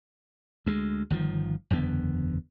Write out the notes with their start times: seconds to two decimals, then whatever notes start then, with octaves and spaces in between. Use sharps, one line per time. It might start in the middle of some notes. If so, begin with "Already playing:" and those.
0.66 D2 G#3
1.10 G1 D#3 F3
1.70 F#1 E2 D3 B3